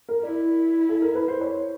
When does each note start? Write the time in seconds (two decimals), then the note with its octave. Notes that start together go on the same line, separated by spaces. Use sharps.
0.09 A#4
0.22 E4 D5
0.89 A4
1.02 A#4
1.15 B4
1.28 C5
1.41 C#5